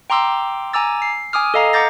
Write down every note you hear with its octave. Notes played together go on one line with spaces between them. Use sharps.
G5 A#5 C6 D6 E6
G#5 A#5 D6 E6 A6
C7
G#5 D6 D#6 F6
A4 D#5 F5 A#5
F#5 A#5 D6 G6 A6 A#6